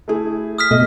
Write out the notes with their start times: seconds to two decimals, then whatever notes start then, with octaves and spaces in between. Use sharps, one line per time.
0.08 A3 E4 G#4
0.58 D#6 F6 B6
0.71 B2 A3 D#5